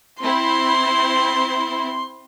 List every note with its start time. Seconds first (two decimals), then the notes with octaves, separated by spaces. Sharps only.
0.23 C4 E4 C6